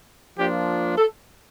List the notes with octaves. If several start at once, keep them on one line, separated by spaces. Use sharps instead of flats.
F3 A#3 D4 F4 G4
A4